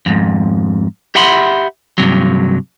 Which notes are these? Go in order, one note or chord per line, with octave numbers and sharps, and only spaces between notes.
F2 G#2
G4 E5 F#5 B5 C6
G2 C3 F#3